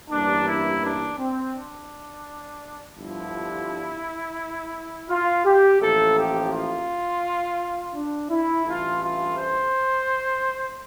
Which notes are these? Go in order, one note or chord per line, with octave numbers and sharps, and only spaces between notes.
A1 G2 E3 A#3 D4
E4
D4
C4
D4
G1 G2 D3 F3 E4
F4
G4
A1 A2 F3 A#3 A4
G4
F4
D4
E4
A1 G2 E3 A3 F4
F4
C5